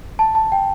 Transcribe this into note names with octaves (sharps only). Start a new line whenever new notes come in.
A5
A5
G5